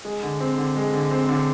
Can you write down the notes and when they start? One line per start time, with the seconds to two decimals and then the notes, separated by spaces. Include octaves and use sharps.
0.05 G#3
0.23 D3
0.40 C4
0.58 D3
0.76 G#3
0.93 D3
1.11 C4
1.29 D3